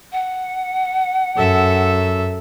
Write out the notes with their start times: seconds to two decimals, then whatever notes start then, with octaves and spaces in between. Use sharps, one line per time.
0.12 F#5
1.37 F#2 A4 E5